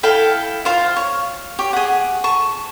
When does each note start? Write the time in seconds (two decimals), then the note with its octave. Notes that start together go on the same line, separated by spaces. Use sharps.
0.03 E4 A4 F5 G5
0.65 F4 C5 F5
0.96 C#5
1.59 G4 C#5
1.73 G#4 F#5
2.24 A5 C#6